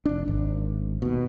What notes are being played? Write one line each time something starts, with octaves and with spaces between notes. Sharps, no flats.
F1 D4
G#1
D#2 B2